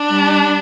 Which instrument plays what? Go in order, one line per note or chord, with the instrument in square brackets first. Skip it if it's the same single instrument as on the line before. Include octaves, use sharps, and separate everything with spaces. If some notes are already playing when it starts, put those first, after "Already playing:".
Already playing: [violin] D4
[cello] G3